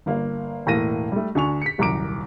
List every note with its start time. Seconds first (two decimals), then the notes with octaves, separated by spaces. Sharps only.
0.06 G1 A#3 F5
0.66 E1 A2 A#3 F5 A#6 D#7
1.12 G3 A3
1.35 D2 D4 G#5 C#6 F7
1.62 B6 C#7
1.78 D#1 C2 F#2 A#5 D6 D7